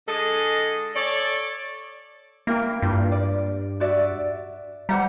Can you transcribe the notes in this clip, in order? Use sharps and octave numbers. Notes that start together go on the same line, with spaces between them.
D3 G#3 G#4 A4 D#5
A4 C#5 D5
A#3 E4 A#4 G5
G2 F4
D5
F#4 D5 E5
G3 C5 F#5 A#5